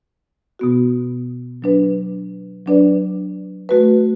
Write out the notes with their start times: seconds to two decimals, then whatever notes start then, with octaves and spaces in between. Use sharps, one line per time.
0.59 B2 B3 F#4
1.62 F#3 D4 B4
2.66 F#3 D4 B4 D5
3.69 A3 F#4 B4